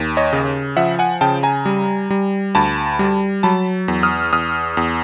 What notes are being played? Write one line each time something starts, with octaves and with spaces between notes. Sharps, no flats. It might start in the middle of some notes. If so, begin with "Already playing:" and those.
Already playing: D#2
C#5 D#5
C#3
F3 E5 F#5
F#5 G#5
C#3 G5 A5
G#5 A#5
G3
G3
D2 A5 B5
G3
F#3 A5 B5
E2
D#6 F6
E2 D#6 F6
E2